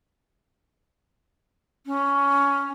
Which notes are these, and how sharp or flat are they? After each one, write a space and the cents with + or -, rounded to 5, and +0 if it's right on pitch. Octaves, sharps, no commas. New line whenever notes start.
C#4 +10